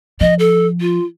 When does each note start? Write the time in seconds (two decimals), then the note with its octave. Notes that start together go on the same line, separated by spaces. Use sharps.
0.21 F3 D#5
0.39 A4
0.81 F4